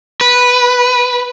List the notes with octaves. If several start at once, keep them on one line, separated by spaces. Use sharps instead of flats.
B4